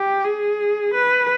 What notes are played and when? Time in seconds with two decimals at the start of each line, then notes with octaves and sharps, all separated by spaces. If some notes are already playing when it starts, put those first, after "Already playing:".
Already playing: G4
0.24 G#4
0.94 B4